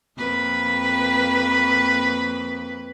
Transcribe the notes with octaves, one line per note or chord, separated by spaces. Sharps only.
F2 A#3 B4